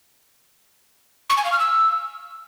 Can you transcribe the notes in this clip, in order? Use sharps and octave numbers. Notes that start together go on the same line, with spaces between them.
C#6
G#5
F5
F6
E6